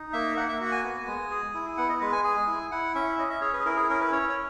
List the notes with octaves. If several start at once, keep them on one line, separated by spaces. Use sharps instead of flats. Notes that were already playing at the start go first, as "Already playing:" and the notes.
Already playing: D#4
A#3 E5
A#3 F#5
E5
F#4 F#5
G#5
B3
G#3
G#4
E4
B3 F#5
D#5
G#3 B4
G#5
G#4 G#5
E4
E4 F#5
C#4 E5
C#4 D#5
E5
G#4 C#5
B4
G#4
E4 A#4
G#4
C#4 A#4
B4
C#4 C#5
C#5